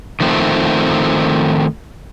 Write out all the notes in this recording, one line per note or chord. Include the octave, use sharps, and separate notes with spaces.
D#3 F3 A3 C4